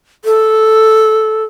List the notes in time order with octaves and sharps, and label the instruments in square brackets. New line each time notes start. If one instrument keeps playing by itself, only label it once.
[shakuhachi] A4